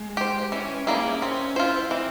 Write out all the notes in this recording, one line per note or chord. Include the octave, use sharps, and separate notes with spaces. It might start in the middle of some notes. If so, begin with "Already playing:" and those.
Already playing: G#3
G4 C5
E3 C#4
G3 A#3 C#4 E4 G#4
C4 C#4
E4 F4 C5
E3 C4